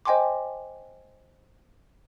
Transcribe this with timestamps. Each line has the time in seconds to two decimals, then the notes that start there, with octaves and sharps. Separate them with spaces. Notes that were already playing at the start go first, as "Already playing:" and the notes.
0.05 C5 D#5 G5 G#5 C6 D6